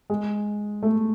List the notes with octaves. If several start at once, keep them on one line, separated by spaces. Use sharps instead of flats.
G#3
A3